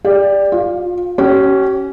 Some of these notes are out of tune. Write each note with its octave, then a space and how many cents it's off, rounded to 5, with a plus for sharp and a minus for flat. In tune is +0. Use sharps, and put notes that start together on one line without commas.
G4 +25 D5 +0
F4 +30 F5 +0
C#4 -5 G4 -45